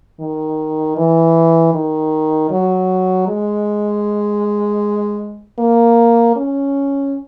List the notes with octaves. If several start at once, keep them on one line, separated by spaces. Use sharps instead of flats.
D#3
E3
D#3
F#3
G#3
A#3
C#4